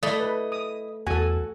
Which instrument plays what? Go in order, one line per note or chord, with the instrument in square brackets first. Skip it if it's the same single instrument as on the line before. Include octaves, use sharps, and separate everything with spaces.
[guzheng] A3 [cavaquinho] E4 D#5 [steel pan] D5
[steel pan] B4
D#6
[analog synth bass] E2 [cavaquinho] F#4 [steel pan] A4 G#5